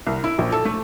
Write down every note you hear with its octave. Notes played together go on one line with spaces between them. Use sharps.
C2
E4
A#1
A4
A3